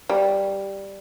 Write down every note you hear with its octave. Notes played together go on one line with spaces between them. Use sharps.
G3